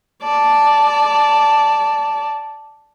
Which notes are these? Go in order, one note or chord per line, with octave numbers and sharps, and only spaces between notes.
D5 A5